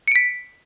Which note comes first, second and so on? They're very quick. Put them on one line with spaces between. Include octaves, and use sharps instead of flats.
C#7 D7 B6